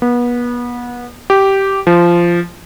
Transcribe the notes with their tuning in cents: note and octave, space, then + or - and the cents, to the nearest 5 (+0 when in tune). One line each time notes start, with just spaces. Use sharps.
B3 -30
G4 -10
F3 -15